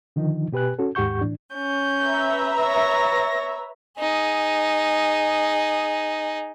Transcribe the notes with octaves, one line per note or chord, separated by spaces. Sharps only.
D3 D#3 F3 D#4
B2 G4 B4 G#5 F#6
C#4 F#4 A4
D#2 G#2 G4 F#5 C#6 G6
A2 E3 D4
C#4 G6
B4 E5 A#5
C#5 A#6
D#4 G#4